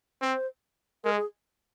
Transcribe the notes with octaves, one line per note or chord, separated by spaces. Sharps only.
C4 C5
G#3 A#4
G#4